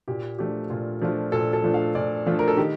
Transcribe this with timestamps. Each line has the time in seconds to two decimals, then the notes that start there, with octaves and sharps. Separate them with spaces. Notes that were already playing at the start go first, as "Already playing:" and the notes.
0.08 A#2 G4
0.38 F3 A3 D4 F4 G4
0.70 A#2 F4
1.01 F3 A3 D4 F4
1.32 A#2 A4
1.53 A4
1.64 F3 A3 D4 F4
1.74 F5
1.95 A#2 D5
2.26 F3 A3 D4 F4
2.39 A#4
2.48 A4
2.57 D#3 G4